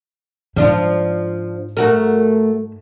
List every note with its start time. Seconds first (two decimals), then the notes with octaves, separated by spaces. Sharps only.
0.56 G#2 F3 D4 F4
1.77 A3 F#4 A#4